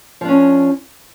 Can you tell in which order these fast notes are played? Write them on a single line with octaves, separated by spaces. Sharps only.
F3 D4 C#4